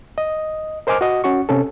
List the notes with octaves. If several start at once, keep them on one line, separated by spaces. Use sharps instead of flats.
D#5
A#4 C5 D#5 G#5 D6 F6
F#4 D#5
C#4 F#4 C#6
C3 C#4 A4